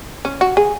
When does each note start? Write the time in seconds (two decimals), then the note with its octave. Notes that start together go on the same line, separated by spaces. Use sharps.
0.25 C#4
0.41 F#4
0.57 G#4